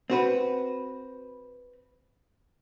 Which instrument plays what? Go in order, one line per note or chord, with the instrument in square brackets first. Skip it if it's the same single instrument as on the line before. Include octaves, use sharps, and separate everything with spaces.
[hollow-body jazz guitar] C4 F#4 B4